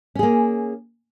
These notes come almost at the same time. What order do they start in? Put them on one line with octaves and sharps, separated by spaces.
C#4 G#4 A#3